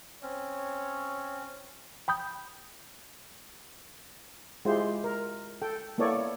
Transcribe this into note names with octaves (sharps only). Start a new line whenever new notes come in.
C4 C#4 C#5
G5 B5 D#6 G6
G#3 E4 F4 G4 G#4 C5
A#4
A4 G5
A#3 B3 E4 A4 C#5 D5